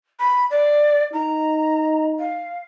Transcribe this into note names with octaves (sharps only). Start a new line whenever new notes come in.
B5
D5
D#4 A#5
F5